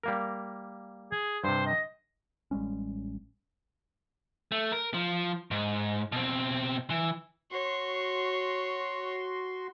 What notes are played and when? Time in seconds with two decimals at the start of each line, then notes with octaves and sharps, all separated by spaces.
0.03 G3 A#3 A#4
1.12 G#4
1.44 G2 C3 C5
1.66 D#5
2.51 A1 G3 G#3 C#4
4.52 A3
4.72 A#4
4.94 F3
5.51 G#2
6.12 B2 C4
6.90 E3
7.52 F#4 C#5 C6